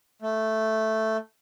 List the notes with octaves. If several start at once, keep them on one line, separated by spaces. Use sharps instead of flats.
A3